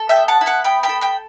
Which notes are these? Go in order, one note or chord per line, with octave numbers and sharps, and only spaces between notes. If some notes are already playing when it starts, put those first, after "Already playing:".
Already playing: A4
E5 G5
B3
F#5 A5
E4
F#5 A5
B3 G5 B5
G5 B5
A4
G5 B5